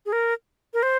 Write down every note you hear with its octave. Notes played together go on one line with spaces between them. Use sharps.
G#4
A#4
A#4
C5